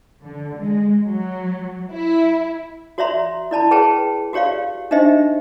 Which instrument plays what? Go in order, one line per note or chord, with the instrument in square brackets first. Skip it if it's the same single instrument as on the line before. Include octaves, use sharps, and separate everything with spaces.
[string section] D3
G#3
F#3
E4
[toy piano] F#4 C#5 D5 E5 A#5 C6
E4 D5 A5 B5
G#4 B4 C#5 G5 A5
F#4 G4 C#5 D5 F5
D4 D#4 G4 C5 D#5 E5